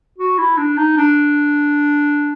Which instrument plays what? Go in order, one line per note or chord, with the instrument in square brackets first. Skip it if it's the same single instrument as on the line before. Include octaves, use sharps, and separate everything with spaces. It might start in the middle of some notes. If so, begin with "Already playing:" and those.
[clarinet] F#4
E4
D4
D#4
D4